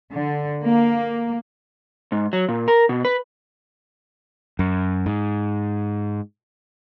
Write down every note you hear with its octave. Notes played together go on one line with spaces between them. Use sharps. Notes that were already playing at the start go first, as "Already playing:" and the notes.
D3
A#3
G#2
F#3
A#2
A#4
B2
B4
F#2
G#2